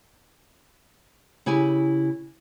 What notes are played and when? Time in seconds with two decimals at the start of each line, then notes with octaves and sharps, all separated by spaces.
1.46 C#3 E4 G4 G#5